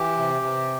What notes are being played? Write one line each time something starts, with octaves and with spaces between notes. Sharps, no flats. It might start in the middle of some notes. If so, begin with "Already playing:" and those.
Already playing: E3 G4
C3
C3